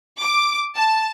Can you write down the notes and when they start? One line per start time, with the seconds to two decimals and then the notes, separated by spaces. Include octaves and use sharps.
0.21 D6
0.75 A5